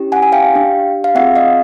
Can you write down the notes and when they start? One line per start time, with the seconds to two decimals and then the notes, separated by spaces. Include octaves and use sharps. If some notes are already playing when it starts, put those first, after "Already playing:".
Already playing: C#4 E4 G4
0.12 F#5 G#5
0.23 G#5
0.32 F5 G5
0.53 D4 G4
1.04 F5
1.15 C4 F4 G#4 E5 F#5
1.36 D#5 F5